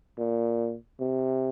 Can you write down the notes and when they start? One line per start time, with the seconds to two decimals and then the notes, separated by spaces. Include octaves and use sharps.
0.19 A#2
1.00 C3